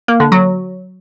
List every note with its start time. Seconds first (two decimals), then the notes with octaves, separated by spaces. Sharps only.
0.08 A#3
0.20 D3
0.32 F#3